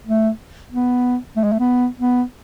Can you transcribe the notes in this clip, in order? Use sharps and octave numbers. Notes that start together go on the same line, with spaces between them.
A3
B3
A3
G#3
A3
B3
B3